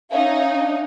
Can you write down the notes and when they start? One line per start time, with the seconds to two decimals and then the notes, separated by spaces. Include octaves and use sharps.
0.11 C#4 D#4 E5 F5
0.54 D4